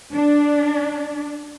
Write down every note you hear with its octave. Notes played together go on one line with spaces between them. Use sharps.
D4